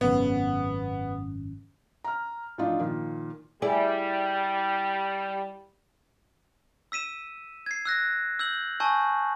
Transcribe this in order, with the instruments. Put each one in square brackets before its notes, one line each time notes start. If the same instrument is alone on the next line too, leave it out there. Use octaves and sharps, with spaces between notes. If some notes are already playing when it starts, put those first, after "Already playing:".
[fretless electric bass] G#1 F#2 C#3 [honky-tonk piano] B3
[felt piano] A#5 F6
A2 E3 F3 D4 D#4 F4
A#2 D#3 F3
[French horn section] G3 [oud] E4 G#4 D5
[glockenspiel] E6 B6 D#7 E7
G#6 C7
E6 F#6 A#6
E6 G6 F#7
G#5 A5 C#6 E6 G6